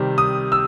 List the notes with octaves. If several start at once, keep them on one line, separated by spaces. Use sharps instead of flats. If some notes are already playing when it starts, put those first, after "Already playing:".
Already playing: C3 D#3 G3
D#6
E6